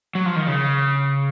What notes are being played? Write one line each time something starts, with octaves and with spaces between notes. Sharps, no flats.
F#3
F3
D#3
C#3